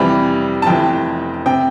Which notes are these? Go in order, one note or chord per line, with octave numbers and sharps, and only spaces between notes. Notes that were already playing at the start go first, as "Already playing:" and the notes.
Already playing: F2 C3 E3 G3 B5
A5
F1 F2 E3 G5
C3 G5